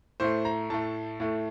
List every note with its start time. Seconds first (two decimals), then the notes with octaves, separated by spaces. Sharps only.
0.20 A2 A3 C5
0.45 A#5
0.70 A2 A3 A5
1.20 A2 A3